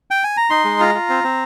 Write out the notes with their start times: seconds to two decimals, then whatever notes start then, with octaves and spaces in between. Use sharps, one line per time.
0.11 G5
0.24 G#5
0.37 A#5
0.50 D#4 C6
0.65 G#3
0.80 F4 A#5
0.95 F4
1.09 C4
1.24 C4